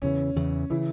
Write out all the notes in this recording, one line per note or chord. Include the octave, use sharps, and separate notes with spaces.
E2 C#3 E3 C#4
E2 C#3 E3
C#3 E3 E4